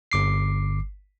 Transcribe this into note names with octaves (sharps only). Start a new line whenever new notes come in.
G1 D6 C7